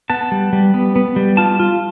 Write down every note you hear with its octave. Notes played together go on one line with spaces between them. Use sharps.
B3 A5
G3
G3
B3
B3
G3
F4 A5
F4